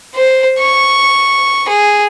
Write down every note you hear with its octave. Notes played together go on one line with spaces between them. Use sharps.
C5
C#6
G#4